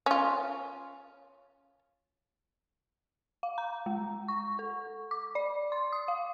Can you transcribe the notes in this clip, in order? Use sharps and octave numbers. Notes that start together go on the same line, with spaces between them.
C#4 F4
F5
A#5
G#3
C#6
A4
D6
D5
C6
D#6
F5